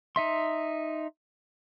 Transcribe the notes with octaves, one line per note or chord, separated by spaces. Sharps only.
D#4 E5 C6